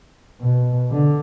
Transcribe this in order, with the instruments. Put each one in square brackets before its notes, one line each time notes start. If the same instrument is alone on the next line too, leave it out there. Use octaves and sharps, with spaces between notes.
[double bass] B2
D3